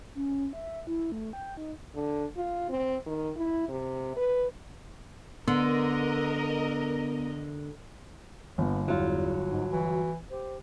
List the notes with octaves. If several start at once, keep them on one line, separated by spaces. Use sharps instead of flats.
C#4
E5
E4
A3
G5
D#4
D3
F4
C4
D#3
E4
C3
B4
D3 B3 A#4 D#5
G1 A#3 B3
E2 F#3 E4 F4
G#2 D#4
E3 F#4
G4 C5